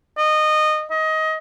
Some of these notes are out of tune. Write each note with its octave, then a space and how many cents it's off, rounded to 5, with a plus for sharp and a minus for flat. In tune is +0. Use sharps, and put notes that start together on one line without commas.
D#5 -20
D#5 +20